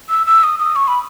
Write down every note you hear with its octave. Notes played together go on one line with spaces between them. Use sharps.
E6
E6
D#6
D#6
C#6
B5